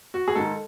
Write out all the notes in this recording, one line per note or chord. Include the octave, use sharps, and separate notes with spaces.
F#4
G#4
G#2 D#3 G#3 A4